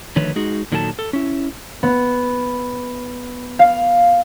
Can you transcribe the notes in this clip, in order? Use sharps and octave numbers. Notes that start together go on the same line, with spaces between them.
D3 D#3 F3 A3 B4 C#5
G#3 D#4 F#4 G#4
A#2 D#3 F#3 A4 G#5 A5
A4
C#4 E4
B3
F5